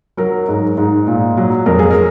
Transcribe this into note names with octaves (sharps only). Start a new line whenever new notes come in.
F#3 A#4
G#2
G#2
A#2
F#3
F2 A#4
G#4
A#4